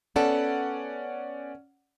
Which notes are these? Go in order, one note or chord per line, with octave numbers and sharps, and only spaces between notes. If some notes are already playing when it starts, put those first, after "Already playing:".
A3 B3 C#4 A4 D5 F#5